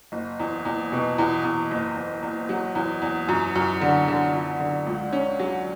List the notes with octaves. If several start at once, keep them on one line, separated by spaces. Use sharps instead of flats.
F#1
E2
E2
B2
E2
E2
F#1
E2
E2
F#3
E2
E2
F#2
F#2
D3
D3
F#2
D3
C#2
C#4
F#3